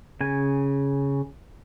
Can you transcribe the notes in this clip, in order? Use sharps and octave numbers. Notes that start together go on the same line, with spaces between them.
C#3 G#5